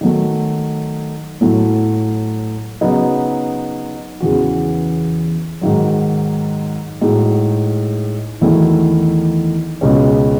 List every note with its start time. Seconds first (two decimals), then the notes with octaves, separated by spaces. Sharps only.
0.01 D#3 F#3 A3
1.41 A2 F#3 A3 E4
2.81 C#3 F#3 B3 D#4
4.20 E2 C#3 E3 B3 F#4
5.61 G#2 D#3 F#3
7.01 A2 G#3 D#4 F#4
8.41 E2 D#3 F#3 A3 E4
9.81 C#2 B2 G#3 C#4